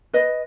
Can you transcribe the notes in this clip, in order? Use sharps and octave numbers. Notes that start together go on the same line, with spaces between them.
B4 D#5